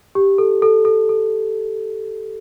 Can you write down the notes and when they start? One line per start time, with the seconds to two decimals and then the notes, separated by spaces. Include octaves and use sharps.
0.15 G4
0.38 A4
0.62 A4
0.85 A4
1.09 A4